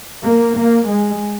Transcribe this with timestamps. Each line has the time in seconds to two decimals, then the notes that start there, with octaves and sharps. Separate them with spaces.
0.23 A#3
0.56 A#3
0.87 G#3